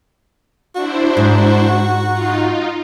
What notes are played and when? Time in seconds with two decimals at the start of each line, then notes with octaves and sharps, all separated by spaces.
0.75 D4 E4 F#4 C5
1.17 G#2
2.13 D#4 F4